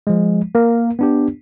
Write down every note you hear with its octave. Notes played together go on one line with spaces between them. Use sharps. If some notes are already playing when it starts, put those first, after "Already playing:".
F3 G#3
A#3 A#4
B3 D4 G4